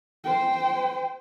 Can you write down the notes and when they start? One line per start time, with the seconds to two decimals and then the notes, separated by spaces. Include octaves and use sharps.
0.24 C5 G5